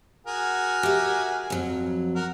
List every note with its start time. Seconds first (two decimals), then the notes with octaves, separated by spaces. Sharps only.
0.26 F#4 G#4 A#4
0.83 G4 E5
1.50 F2 F#3
2.15 F#4 A#4